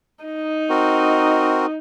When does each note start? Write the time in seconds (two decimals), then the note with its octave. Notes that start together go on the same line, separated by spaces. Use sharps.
0.25 D#4
0.70 C4 F#4 A#4